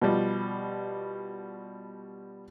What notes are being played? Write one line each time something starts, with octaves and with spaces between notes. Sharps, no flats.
B2 F3 G3